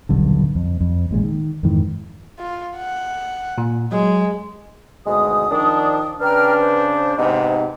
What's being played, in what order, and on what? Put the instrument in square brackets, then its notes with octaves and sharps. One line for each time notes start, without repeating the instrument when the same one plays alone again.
[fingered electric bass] D#1 B1 G2 D3
F2
F2
A1 A#2 G#3
D#3
F2 G#2 D#3 E3
[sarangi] F4
F#5
[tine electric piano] A#2
[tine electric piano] F#3 [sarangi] G#3
[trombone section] G#1 D2 B2 [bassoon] G#3 [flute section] D#6
[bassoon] D#3 [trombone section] F3 D4
[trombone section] C#3 D4 [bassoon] B4 [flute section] G5 A#5 F6
[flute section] C5
[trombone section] G#2 C3 B3 [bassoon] D#4